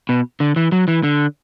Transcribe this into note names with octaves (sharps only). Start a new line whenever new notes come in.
B2
D3
E3
F#3
E3
D3